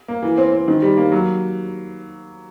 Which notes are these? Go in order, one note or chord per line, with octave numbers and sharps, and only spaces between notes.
A#3
E3
C4
C4
D#3
G3
A#3
F#3